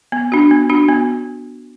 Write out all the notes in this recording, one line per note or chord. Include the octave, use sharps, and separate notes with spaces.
B3
D4 F#4
B3
D4 F#4
B3